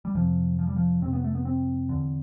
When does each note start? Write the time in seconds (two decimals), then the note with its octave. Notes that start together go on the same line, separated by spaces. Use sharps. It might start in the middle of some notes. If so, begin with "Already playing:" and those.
0.05 G3
0.15 F2 C3 F3
0.59 F3
0.67 G3
0.76 F3
1.02 F2 C3 C4
1.13 B3
1.24 A3
1.35 B3
1.45 C4
1.89 E2 D3